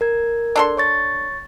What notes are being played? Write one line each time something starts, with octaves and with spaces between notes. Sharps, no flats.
A#4 G#6
D4 A4 C6
C#5 C#6 A6